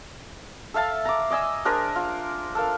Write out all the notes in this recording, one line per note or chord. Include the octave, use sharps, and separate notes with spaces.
A4 E5 F5 A5
A#5 D6
D5 D#5 G#5 E6
D4 G#4 A#4 C5
F4
A4 A#4 F5